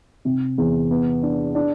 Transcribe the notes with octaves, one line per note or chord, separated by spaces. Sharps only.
C3
E2
B3
D4
D4